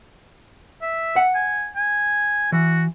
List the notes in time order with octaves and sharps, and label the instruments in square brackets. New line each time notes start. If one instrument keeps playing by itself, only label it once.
[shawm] E5
[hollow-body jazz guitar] F#5
[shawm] G#5
G#5
[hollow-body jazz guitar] E3 [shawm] F#4